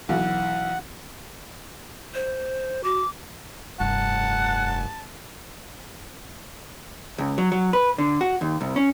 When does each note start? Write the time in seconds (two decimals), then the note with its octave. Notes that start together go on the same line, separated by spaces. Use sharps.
0.09 B1 E3 F#5
2.14 C5
2.84 F#4 D6
3.80 F1 G2 F#5 A5
7.18 C#2
7.38 F#3
7.52 F#3
7.73 B4
7.98 D3
8.21 F#4
8.41 D#2
8.61 C2
8.76 C#4